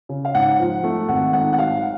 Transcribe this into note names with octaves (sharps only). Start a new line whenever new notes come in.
C#3
F5
G#2 F#5
F3
A3
G#1 F#5
G#2 F#5
F#5
F#3 F5